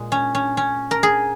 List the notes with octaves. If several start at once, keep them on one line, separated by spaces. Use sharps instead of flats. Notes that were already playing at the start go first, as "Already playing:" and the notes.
Already playing: A#2 G#3
C#4
C#4
C#4
A#4
G#4